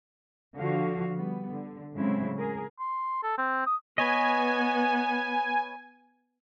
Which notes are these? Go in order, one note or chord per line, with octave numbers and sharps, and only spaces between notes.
D3 F3 F#4 F5
G3 B3
D3
A2 C#3 F#3 G#3 C4 E4
G#4 A#4
C6
A4
C4
D#6
B3 B4 C#5 D#5 G#5